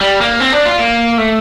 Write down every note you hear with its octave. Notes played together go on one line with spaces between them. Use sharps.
G3
A#3
C4
D4
F4
A#3
A3